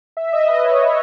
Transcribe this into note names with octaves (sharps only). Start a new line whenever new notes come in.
E5
D#5
B4
C#5
C#5